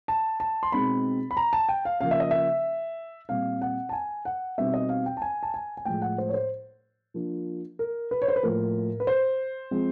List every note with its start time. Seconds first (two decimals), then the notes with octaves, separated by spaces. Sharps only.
0.08 A5
0.40 A5
0.63 C6
0.72 B2 G#3 C4 D#4 B5
1.31 B5
1.37 A#5
1.53 A5
1.69 G5
1.85 F5
2.01 C#3 F3 A#3 F5
2.11 E5
2.20 D#5
2.31 E5
3.29 A#2 G3 C4 F5
3.61 F#5
3.89 A5
3.93 G#5
4.25 F#5
4.58 B2 G3 C4 D#4 E5
4.74 D#5
4.89 F5
5.06 G5
5.17 A5
5.22 G#5
5.43 A5
5.54 G#5
5.77 G#5
5.85 A2 F3 G#3 G5
6.02 F#5
6.18 C5
6.29 C#5
6.34 C5
7.14 F3 A#3 D4 F4
7.79 A#4
8.11 B4
8.22 C#5
8.28 C5
8.36 B4
8.43 A2 F3 A#3 A#4
9.00 B4
9.07 C5
9.71 F3 G#3 C4